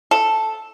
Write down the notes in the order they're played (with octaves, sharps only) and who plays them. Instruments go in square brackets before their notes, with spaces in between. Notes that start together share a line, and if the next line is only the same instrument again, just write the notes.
[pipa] A4